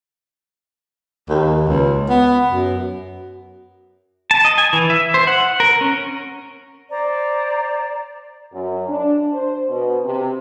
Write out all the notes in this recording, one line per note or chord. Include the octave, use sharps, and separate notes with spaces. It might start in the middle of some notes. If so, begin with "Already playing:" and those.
D#2
C#2
B3
F#2
A5
D#5
G#5
E3
E5
C5
F#5
A#4
C#4
C5 D5 A#5
F#2
D4
C5
B2
C3